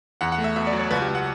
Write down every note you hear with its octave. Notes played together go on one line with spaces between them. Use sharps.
E2 F#5
F#5
A3
E5
B2 E5
D5
F#3
C#5
C#2 B4
G4
C#2
F#5